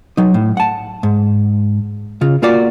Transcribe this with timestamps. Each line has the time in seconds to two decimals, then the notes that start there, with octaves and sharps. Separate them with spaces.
0.17 F#3 D#4
0.34 A2
0.57 F#5 A5
1.03 G#2
2.21 C#3 F4
2.42 A#3 F4 F#4 D5